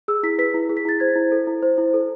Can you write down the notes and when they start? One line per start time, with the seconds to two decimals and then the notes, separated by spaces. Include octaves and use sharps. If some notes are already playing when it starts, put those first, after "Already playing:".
0.08 G#4 E6
0.23 E4 B6
0.39 B4 B6
0.54 E4
0.69 G#4
0.77 B6
0.85 E4 A6
1.00 C5 G#6
1.15 E4
1.32 A4
1.47 E4
1.63 C5
1.78 E4
1.94 A4